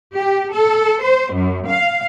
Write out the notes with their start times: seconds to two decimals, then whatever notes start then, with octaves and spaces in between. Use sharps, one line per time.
0.14 G4
0.53 A4
1.01 C5
1.33 F#2
1.68 F5